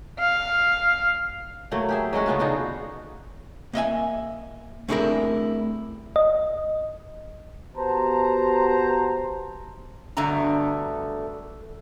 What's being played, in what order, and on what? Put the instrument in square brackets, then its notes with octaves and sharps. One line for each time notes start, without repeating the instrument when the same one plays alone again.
[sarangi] F5
[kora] F#3 A3 A#3
G4 G#4 E5
F#3 G#3 C#4 F#4
C#3 B3 D4 F4
D3 D#4 F4 F#4
[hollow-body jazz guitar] A#3 D#5 E5 G#5
A3 C4 D4 E4 G#4 A#4
[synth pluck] D#5
[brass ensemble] B3 F#4 G4 C5 A5 A#5
[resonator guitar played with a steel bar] G2 B2 D3 A3 A#5